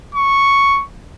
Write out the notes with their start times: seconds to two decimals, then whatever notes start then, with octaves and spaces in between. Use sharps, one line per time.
0.15 C#6